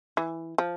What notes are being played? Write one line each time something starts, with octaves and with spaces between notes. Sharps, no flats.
E3
F3